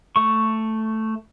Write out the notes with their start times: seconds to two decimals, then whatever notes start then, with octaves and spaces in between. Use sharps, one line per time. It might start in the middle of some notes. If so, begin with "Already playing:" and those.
0.16 A3 C#6